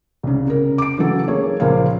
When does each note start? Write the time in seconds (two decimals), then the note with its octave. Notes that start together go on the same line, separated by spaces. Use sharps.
0.23 C2 C#3
0.48 C#3 A#4
0.78 D6 D7
0.98 C#3 E3 F#3 A4
1.28 A#3 G#4 C#5
1.60 C#2 A#2 F3 A#3 A#4 F5